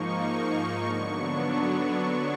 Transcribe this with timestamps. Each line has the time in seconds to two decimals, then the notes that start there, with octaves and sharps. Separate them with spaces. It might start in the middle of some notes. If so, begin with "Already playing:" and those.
Already playing: G#2 F3 A#3 D#4 C#6
0.86 D3 F#3 B3 D4